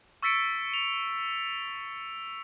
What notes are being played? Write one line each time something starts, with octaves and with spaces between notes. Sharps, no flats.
C#6 E6 A6 B6 C#7 D7
F7